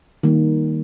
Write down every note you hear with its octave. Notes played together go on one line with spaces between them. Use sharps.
D#3 G3 A#3